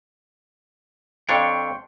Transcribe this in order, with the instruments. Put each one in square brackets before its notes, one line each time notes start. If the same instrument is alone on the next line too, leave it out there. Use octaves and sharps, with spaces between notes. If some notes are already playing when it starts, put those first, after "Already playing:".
[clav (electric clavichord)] F2 D4 C#5 [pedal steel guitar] G5 C6 C#6